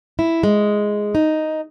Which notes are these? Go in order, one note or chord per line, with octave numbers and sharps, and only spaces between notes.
E4
G#3
D#4